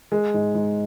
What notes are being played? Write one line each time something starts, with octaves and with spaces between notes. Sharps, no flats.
G#3
G#2
G#2